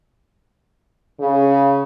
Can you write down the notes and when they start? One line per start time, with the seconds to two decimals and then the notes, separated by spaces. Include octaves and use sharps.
1.20 C#3